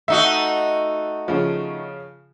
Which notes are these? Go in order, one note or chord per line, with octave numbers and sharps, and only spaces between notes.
A3 D#4 F#4 E5
C#3 F3